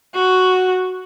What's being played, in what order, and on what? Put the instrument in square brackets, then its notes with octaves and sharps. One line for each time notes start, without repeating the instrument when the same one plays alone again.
[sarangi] F#4